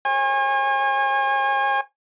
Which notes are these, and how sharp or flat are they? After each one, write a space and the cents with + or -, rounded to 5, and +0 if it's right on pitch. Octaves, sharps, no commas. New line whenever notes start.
C#5 -40 G#5 -35